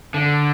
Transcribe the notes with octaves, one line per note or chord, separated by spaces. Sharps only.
D3